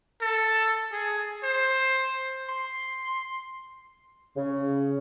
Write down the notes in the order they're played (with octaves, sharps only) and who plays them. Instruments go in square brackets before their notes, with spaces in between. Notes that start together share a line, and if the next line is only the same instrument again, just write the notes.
[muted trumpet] A4
G#4
C5
[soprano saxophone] C6
[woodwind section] C#3